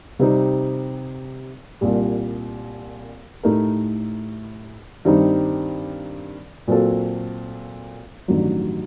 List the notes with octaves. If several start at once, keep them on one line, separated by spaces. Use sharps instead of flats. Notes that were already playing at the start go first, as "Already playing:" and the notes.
C3 G3 C4 D#4
C2 A#2 G3
A2 A3 D#4 G4 A#4
G2 D#3 G3 C4 D#4
A#2 F#3 C4 F#4 A4
A1 G2 D#3 F#3